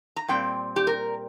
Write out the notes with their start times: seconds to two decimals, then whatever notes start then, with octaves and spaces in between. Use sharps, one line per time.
0.16 A#5
0.28 A#2 G3 C4 G5
0.76 G4
0.87 A#4